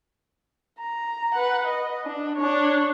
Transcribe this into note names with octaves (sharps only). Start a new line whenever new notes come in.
A#5
B4 F#5
D#5
D4
D4 C#5